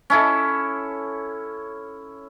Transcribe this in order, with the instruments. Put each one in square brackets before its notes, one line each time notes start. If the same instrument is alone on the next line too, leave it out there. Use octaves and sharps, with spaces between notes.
[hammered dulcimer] C#4 E4 A4